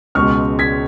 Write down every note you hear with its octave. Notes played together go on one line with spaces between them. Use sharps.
C#2 B2 G#3 C#6 F6
G#6 B6